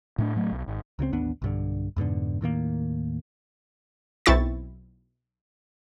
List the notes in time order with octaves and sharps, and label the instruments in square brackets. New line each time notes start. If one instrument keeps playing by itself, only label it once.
[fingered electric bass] A2 A3 D4
A2 F#3 A3
B1
G#1
[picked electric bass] C#2 C#3 E3 C4
A1 D#2 B3 D4
B1 G2 D3
F2 G#2 B2 D3
D#2 A2 D#3 A#3
[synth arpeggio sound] B1 C4 E4 C#6 A6